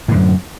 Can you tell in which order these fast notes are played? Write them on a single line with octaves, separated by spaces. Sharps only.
A2 D3 F#2